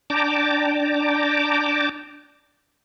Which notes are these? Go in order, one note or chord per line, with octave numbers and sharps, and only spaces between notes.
D4 G5 A5 A#5 D6